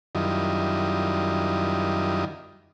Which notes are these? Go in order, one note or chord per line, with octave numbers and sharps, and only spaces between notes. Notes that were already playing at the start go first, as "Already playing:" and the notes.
F#2 D#3 G3 E4 F4 D#5